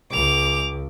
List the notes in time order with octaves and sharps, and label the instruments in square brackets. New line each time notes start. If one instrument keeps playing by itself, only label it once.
[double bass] C#2 [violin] D6 F7